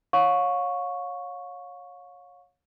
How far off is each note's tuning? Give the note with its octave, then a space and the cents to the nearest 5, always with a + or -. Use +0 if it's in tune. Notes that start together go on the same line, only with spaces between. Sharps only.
C#5 +0 F5 +40 C#6 +0